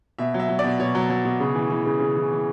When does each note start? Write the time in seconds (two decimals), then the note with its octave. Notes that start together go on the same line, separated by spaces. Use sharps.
0.19 B2 E5
0.34 F#3
0.40 E5
0.49 F#3
0.59 D5
0.64 B2
0.79 B2 C#5
0.95 F#3
1.10 F#3
1.25 B2
1.40 C#3
1.55 E3
1.71 E3
1.86 C#3
2.00 C#3
2.16 E3
2.32 E3